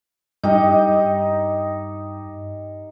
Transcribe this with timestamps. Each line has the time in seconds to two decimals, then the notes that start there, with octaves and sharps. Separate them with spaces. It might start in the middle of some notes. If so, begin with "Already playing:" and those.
0.43 G2 D#4 G4 D#5